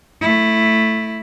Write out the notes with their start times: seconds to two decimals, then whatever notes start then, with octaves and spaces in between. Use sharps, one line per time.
0.21 A3 E4